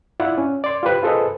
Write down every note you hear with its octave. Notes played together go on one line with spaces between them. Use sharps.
E4 F4 D5 F#5
C#4
D5 C6
F4 G4 B4 C5
F4 G#4 A4 B4 C5 D#5